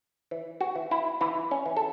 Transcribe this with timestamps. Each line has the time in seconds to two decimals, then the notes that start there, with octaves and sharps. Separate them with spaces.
0.31 E3
0.61 F#4
0.75 E3
0.91 E4
1.21 E3 E4
1.51 C#4
1.66 E3
1.77 A4